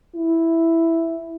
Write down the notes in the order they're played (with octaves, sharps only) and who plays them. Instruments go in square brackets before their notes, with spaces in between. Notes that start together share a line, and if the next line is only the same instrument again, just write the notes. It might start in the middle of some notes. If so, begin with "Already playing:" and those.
[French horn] E4